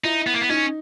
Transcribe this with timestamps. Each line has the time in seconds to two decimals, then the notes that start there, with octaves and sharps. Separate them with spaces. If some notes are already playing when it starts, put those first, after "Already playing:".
0.04 D#4 E4
0.27 B3
0.34 A#3
0.41 B3
0.49 C#4 D#4